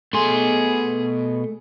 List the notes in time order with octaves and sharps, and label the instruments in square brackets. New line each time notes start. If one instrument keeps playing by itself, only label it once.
[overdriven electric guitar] B2 C6 [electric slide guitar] A3 [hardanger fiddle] G#4